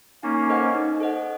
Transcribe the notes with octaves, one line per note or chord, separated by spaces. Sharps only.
A#3 C#4 D#4
A4 C5 D#5 F#5
D#4
A4 C5 D#5 F#5